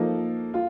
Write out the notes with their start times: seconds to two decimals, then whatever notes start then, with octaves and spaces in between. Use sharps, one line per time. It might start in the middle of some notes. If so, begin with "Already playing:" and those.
Already playing: F3 A#3 D#4 A4
0.54 F4